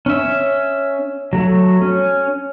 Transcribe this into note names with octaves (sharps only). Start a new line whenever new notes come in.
C#4 E5
F#3 A3
C#4